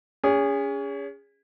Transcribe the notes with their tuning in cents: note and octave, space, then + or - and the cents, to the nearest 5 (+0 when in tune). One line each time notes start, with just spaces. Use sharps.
C#4 +30 G#4 -25